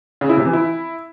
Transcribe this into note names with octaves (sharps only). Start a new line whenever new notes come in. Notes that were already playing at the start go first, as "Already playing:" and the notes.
C#3
E4
C3
E3
E4